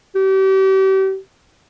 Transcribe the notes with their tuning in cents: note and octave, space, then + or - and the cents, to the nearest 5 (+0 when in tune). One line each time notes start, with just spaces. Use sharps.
G4 -35